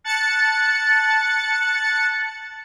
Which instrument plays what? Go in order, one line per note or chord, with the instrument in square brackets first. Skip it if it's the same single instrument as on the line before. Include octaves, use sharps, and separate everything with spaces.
[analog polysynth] A5 F#6 A6 C#7